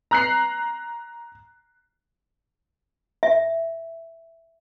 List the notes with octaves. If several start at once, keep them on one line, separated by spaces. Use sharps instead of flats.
A#5 F#6 C7
E5